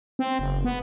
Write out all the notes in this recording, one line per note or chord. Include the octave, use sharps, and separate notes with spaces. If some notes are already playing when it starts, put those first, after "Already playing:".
C4
F#1
B3